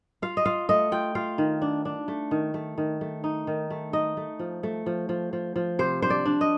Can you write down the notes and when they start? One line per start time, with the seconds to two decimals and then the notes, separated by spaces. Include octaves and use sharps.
0.22 F4 F5
0.37 D#5
0.46 F4 F5
0.69 A3 D#5
0.92 F4 G5
1.15 F4 F5
1.38 D#3
1.62 D4
1.85 D4
2.08 A3
2.31 D#3
2.54 A3
2.78 D#3
3.01 A3
3.24 D#4
3.47 D#3
3.70 A3
3.93 D#4 D#5
4.17 A3
4.39 F3
4.63 A3
4.86 F3
5.09 F3
5.33 F3
5.56 F3
5.79 C3 C5
6.02 D4 C5
6.10 D5
6.26 D4
6.41 D#5